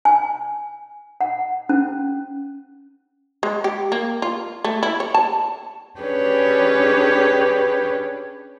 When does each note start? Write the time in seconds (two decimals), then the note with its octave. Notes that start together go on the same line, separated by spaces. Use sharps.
0.05 G#5
1.21 F#5
1.69 C#4
3.43 G#3
3.64 G4
3.92 A#3
4.22 F4
4.64 A3
4.83 E4
5.00 C#5
5.14 A5
5.99 C#4 D4 G4 G#4 B4 C#5